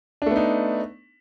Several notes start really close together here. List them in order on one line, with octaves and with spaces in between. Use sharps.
D4 A3 B3 D#4